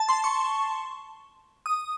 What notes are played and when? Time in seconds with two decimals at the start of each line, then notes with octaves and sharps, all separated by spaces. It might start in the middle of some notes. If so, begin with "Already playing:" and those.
Already playing: A5
0.09 C6
0.24 C#6
1.66 D#6